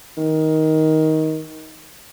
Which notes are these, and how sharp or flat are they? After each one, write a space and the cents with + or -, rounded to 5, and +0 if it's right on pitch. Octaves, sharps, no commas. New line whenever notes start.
D#3 +15